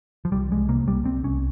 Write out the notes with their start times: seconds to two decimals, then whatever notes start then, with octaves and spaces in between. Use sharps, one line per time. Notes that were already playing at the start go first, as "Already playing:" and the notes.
0.25 F3
0.32 C2 G3
0.51 C2 G#3
0.69 C3 A#3
0.87 C2 G3
1.05 C2 C4
1.23 C2 C#4